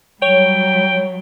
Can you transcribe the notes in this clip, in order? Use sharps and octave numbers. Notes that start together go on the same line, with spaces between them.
F#3 G3 C#5 G5